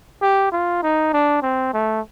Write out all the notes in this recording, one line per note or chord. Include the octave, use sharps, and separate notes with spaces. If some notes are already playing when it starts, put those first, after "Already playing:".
G4
F4
D#4
D4
C4
A3